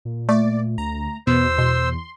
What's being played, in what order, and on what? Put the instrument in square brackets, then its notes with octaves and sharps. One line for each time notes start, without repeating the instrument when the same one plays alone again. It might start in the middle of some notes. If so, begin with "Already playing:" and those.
[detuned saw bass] A#2
[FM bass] A3 [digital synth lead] D5
[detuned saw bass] D2 [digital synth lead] A#5
[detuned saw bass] E2 [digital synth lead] B2 [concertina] C5 E6
[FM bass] B2 [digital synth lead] C6